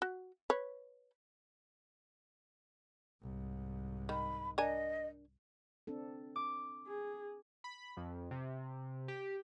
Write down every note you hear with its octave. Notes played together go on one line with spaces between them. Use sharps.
F#4
B4 C#5
C2 G#2
D#3 B5
D4 A#4 D#5 G#5
C4 D4 A4
D6
G#4
B5
F2
C3
G4